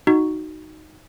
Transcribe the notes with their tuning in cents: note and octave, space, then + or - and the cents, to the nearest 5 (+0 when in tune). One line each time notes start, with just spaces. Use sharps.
D#4 +0 F#4 +0